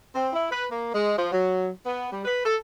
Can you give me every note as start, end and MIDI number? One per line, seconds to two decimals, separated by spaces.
0.15 0.30 60
0.33 0.48 64
0.51 0.66 71
0.71 0.94 58
0.94 1.16 56
1.18 1.30 53
1.32 1.70 54
1.86 2.06 59
2.12 2.24 55
2.25 2.43 71
2.45 2.57 69